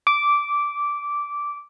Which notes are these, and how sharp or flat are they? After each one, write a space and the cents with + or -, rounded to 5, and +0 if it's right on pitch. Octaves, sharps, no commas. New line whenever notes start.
D6 -10